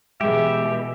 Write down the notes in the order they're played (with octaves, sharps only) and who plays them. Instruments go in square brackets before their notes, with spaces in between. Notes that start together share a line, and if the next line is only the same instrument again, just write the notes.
[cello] B2 E3 [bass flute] G#3 [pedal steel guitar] G4 [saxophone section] E5